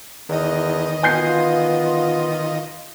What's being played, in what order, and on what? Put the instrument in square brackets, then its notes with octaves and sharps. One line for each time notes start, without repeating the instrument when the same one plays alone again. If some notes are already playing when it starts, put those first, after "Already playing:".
[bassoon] E2 [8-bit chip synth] D#3 D#5
[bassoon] B3 [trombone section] F4 [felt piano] G#5 G6 C7